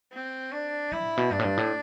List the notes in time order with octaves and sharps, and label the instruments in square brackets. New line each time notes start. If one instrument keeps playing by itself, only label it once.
[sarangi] C4
D4
[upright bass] G3 [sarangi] E4
[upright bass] A2
B2
[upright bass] G2 [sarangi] D4
[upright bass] A2
G2
A2